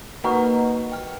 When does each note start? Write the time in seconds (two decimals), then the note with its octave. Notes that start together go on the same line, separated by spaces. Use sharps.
0.24 A#3 D#4 F#4 A#4 B4 F#5
0.92 G5 F6